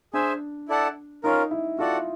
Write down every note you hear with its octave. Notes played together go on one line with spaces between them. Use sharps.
D4 G#4 C5 E5 G#5
E4 A4 D5 F#5 A5
C#4 D#4 F4 A#4
E4
F4 F#4 A4 D5 F#5